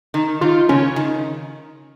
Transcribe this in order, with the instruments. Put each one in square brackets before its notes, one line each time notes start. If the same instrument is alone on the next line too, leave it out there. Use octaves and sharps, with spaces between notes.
[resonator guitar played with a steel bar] D#3
[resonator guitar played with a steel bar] D#3 [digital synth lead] F4
[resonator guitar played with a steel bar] C#3 [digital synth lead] C#4
[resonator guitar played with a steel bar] D#3